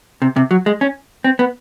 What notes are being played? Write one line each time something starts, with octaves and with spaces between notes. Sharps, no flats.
C3
C3
F#3
G#3
C#4
C4
B3